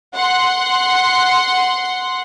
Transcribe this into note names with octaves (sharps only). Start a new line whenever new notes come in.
F#5 C6